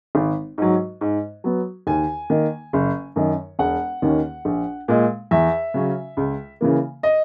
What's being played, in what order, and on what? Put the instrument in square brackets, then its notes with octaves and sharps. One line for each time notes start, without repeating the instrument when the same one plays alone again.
[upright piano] G#1
G#2 F#3
G#2
F#3 B3
D#2 G#5
D#3 A#3
F#1
F#2 D#3
E1 F#5
D#2 D#3 A#3 C#4
A#1
A#2 G#3
E2 E5
C#3 F#3 C#4
C#2
C#3 E3 A#3
D#5